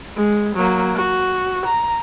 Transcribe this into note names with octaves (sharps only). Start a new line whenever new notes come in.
G#3
F#3 A#3
F#4
A#5